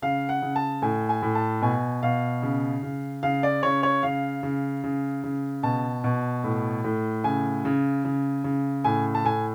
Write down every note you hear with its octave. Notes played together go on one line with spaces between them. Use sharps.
C#3 F5
F#5
C#3
A5
A2 G#5
G#5
A2
A5
B2 G#5
B2 F5
C#3
C#3
C#3 F5
D5
C#3 C#5
C#5
C#3 F5
C#3
C#3
C#3
B2 A5
B2
A2
A2
C#3 G#5
C#3
C#3
C#3
A2 G#5
A5
A2 G#5